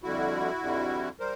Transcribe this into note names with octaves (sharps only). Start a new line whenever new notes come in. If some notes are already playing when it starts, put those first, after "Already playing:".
F2 D3 G3 E4 F#4
F2 D3 G3
G3 A#4 C5